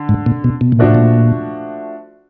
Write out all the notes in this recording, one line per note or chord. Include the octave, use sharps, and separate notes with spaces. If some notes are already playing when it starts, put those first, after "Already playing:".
Already playing: D3
G#2
A#2
B2
B2
A#2
A2 F3 A3 D4 F#4
A#2